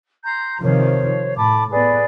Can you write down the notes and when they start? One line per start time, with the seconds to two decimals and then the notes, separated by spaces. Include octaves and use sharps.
0.23 A#5 C6 G6
0.62 C3 D#3 F3 C5 C#5
1.36 A2 A5 B5 D6
1.70 A2 B3 G#4 B4 D5